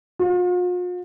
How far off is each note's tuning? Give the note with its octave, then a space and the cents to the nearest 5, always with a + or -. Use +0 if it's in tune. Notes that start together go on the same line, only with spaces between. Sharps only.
F4 +45